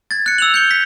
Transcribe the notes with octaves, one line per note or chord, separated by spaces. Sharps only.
G#6 A6
F#6 C#7
E6 F7 F#7
G6 C#7 G7
B6